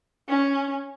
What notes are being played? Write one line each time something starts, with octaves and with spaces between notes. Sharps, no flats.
C#4